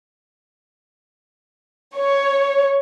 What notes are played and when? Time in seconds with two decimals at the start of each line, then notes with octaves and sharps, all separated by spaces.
1.98 C#5